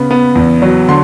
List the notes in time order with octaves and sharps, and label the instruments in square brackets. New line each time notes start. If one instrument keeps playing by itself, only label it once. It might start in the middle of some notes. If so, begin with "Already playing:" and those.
Already playing: [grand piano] C#3 B3
B3
E2
F#3
D3 C6